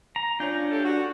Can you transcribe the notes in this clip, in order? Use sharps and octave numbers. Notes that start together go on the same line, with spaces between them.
A#5
C#4 D4 F4 G6
A3 G4 A4
F#4